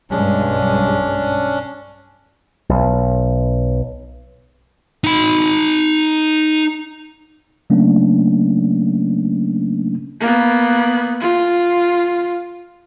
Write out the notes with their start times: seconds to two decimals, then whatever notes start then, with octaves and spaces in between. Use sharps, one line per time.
0.10 B1 G2 G#3 C#4 D4
2.69 B1
5.04 D#4 B5
7.70 C#3 F#3 A3 A#3 C#4 D4
10.21 A#3 B3
11.20 F4